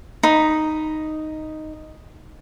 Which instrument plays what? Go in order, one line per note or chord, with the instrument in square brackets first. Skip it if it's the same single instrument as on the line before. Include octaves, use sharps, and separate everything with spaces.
[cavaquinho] D#4 B5